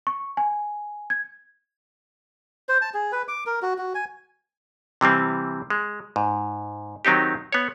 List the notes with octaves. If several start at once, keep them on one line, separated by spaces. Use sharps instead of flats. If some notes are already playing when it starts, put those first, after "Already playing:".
C#6
G#5
G#6
C5
A5
G#4
B4
D6
A#4
F#4
F#4
G#5
C3 E3 G3 C4
G#3
G#2
D#3 F#3 C4 D#4 G4
B3 C#5